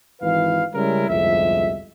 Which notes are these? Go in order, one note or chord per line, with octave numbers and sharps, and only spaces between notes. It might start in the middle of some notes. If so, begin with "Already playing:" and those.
G#1 E3 B4 F5
C#3 G3 G#3 C#4 E4 A#4
G1 C2 F2 G#3 E5